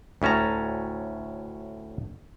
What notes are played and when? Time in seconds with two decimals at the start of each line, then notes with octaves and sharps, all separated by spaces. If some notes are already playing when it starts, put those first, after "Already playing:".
0.22 D2 A2 C#4 A5 A#5